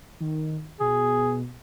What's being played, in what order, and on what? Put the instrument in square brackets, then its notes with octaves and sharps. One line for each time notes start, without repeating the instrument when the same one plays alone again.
[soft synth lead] D#3
[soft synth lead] B2 [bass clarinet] G#4